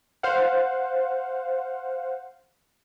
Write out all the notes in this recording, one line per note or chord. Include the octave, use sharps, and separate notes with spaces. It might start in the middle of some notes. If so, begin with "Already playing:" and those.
C5 F5 F#5